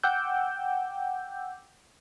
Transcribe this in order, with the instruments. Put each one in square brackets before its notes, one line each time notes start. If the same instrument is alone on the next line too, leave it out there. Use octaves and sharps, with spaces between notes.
[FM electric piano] F#5 G5 D6 E6 G6